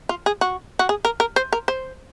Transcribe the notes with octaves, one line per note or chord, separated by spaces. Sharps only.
F4
G#4
F#4
F#4
G#4
A#4
A#4
C5
A#4
C5